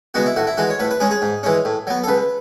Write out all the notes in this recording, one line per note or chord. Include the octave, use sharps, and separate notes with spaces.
C#3 G#3 B3 F#4
E4
A2 F#4
E4
E3 G#3 F#4
C#5
A2 B4
B4
G#3 C#4 G#4
G#4
G#2
E3 G#3 C#4
A2
F#3 B3
A4
C#2 B4